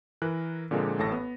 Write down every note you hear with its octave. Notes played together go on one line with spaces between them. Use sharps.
E3 A#4 F#6
A#2 D3 F3 G#3 A#3 C4
A1 A2 A4 A5 A#6
B3